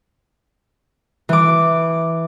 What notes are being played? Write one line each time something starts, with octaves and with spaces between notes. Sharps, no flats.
E3 D6